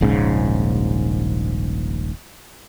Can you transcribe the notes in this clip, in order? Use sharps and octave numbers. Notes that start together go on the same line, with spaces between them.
D#1 A#1 G#2 C#3